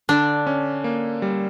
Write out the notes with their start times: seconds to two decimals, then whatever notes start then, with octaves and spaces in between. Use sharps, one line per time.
0.09 D3 D4
0.47 C#4
0.84 A#3
1.22 G3